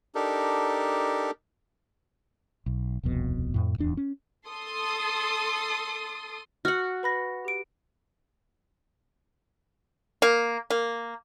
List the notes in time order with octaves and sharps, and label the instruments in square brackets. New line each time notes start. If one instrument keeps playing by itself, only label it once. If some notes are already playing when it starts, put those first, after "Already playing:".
[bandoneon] D4 D#4 G4 A4 A#4
[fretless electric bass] B1
D#1 C2 F2 B2
F2 A2
D1 E2 D4
C#4
[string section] A4 C6 D#6
[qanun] F#4 F#5 [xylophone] F6
[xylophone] B4 B5 A#6
G4 D7
[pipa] A#3
A#3